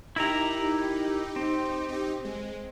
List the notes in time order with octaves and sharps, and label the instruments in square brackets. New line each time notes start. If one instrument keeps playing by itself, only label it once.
[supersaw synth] D#4 G4 [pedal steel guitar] E4 A#4 A#5
[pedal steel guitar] C4
[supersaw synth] D#4 G4
G#3